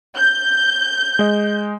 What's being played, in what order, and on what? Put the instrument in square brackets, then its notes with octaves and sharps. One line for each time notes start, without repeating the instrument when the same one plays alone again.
[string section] G6
[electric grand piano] G#3 D#5